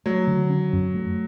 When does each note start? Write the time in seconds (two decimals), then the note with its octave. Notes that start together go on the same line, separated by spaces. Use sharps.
0.06 F#3 A3
0.27 D3
0.50 C#4
0.73 F#2
0.95 A3